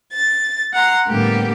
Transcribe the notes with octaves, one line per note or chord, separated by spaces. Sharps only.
A6
F#5 A#5 C6
A2 D3 G3 A#3 B3 G4